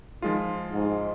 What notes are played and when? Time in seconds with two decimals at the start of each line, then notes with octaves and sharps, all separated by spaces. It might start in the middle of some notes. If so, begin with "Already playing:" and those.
0.22 D#3 F3 G#3 F4
0.71 G#2